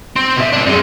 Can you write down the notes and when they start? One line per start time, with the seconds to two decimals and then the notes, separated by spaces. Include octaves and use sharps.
0.16 C4
0.36 B2 E5
0.53 C4 D4
0.66 F#2 G#3